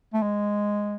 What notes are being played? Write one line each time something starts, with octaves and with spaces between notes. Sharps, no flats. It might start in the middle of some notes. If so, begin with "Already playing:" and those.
A3
G#3